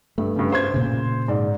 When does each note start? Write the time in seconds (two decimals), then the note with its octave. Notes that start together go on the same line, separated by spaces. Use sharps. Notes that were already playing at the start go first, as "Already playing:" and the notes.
0.18 G2 A3
0.36 G2 C#3
0.52 C5 C6 G#6
0.74 A#2 C#3
1.28 G#2 D5